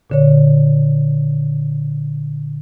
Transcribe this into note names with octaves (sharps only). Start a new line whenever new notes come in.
A#2 D3 C#5